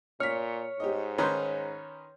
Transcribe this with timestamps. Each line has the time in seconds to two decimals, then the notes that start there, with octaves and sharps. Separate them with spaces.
0.20 A#2 C#5 F6 B6
0.80 G#2 G4 D#5
1.18 D#3 C#4 B4 A#5 C6 G6